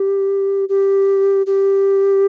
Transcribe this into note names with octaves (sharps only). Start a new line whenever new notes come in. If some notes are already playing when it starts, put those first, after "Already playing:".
Already playing: G4
G4
G4